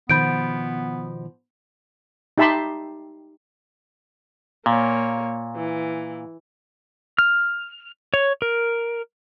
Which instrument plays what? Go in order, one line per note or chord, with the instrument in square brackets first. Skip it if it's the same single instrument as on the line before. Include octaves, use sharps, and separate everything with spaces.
[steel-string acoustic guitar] B2 F3 [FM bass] D#3 [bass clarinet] B3 [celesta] B5 G6 D7
[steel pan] D#4 G4 E5 A5 B5 C6
[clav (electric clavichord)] A#2 [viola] A#3 C#5
[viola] E3
[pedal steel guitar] F6
C#5
A#4